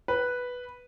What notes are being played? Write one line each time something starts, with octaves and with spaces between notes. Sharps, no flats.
B4